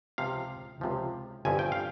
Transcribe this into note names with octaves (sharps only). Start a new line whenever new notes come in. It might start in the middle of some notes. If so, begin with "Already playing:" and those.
C#2 C3 F3 F5
C#2 C3 F3
G1 G2 F3 C4 E4 G#5
G5
F5